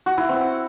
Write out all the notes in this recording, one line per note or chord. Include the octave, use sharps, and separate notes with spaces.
F#4
E4
C4